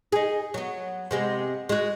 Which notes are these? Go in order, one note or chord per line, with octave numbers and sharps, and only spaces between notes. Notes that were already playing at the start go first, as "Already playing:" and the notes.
D#4 G#4
F#3 B3
C3 G#3 B3
G#3 F#4